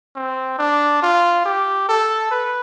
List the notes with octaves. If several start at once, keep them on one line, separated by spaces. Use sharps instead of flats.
C4
D4
F4
G4
A4
B4